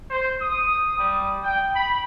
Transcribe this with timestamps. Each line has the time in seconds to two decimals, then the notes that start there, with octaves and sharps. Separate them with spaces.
0.10 C5
0.41 D#6
0.97 G3
1.43 G5
1.74 B5